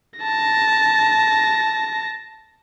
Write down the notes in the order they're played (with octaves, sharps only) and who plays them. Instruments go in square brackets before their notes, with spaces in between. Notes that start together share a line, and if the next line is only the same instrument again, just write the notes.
[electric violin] A5 A#6